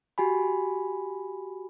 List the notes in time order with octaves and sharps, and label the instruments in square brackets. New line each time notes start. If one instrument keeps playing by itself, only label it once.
[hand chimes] F#4 G4 G#5 B5